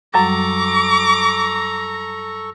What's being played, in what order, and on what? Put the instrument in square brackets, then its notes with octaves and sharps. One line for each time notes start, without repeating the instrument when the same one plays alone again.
[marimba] F#2 F#3 G3 [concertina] A4 C#6 [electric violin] A#5 [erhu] D6